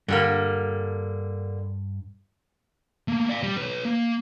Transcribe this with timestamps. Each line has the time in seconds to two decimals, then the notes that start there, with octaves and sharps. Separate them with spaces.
0.08 G2 D3 G3 A#3
3.08 A3 A#3
3.29 D5 F5
3.43 G3
3.58 B4 C#5
3.85 A#3